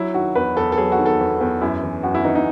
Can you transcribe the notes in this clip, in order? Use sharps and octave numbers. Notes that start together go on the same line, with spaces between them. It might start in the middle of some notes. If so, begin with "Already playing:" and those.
Already playing: F#3 E4
D#3 F#4
E2 B4
E2 A4
A4
F#3 G#4
F#4
D#3
A4
E2
E2
F#2 E4
E3
F#2 F#4
E4
E3 D#4
D#4